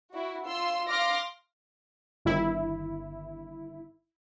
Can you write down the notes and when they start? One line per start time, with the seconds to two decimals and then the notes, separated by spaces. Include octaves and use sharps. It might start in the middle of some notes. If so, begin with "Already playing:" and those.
0.13 E4 F#4
0.45 F4 C6 E6
0.89 F5 C6 D6 F6 A#6
2.25 G1 D#3 E4